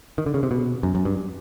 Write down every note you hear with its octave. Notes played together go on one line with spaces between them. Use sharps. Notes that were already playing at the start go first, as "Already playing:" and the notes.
D#3
D3
C#3
C3
B2
F#2
F#2
G2